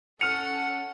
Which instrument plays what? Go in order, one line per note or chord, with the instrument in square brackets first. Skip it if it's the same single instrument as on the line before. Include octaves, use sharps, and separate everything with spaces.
[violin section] C#4 A4 [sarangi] F#5 [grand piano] F6 D#7 F7 [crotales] C#7